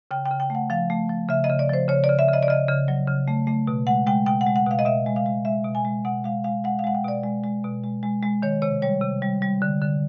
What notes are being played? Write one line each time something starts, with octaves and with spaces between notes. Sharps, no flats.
C#3 G5
G5
C#3
G5
A3 F#5
F3 F5
A3
F3
C#3 E5
D#5
C#3
D5
F3 C5
C#3 C#5
D5
C#3
E5
C#3 D#5
D5
C#3 D#5
C#3
F#3
C#3
A3
A3
B2
G#3 F#5
G#3 G5
B2 G5
F#5
G#3
F#5
B2 F5
D#5
B2 E5
G#3
F5
G#3
G#3 E5
B2
G#5
G#3
B2 F#5
G#3 F5
G#3 F5
G#3 F#5
F5
G#3 F#5
G5
B2 D5
G#3
G#3
B2
G#3
G#3
G#3
D#3 C#5
C3 C#5
G3 C#5
C3
G3
G3
D3
D3